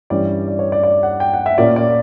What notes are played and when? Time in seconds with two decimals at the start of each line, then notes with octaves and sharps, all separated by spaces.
0.10 G2 E3 G3 C#4 D5
0.48 D5
0.59 C#5
0.72 D5
0.83 D5
1.03 F#5
1.20 G5
1.34 F#5
1.46 E5
1.58 A#2 A#3 C#4 D5
1.76 D5